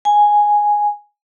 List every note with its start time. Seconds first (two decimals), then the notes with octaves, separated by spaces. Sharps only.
0.05 G#5